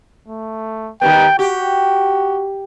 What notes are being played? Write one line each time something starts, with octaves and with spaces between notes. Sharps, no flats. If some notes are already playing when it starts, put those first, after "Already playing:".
A3
D#3 G3 B3 G5
F#4 G4